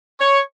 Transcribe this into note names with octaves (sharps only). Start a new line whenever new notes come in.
C#5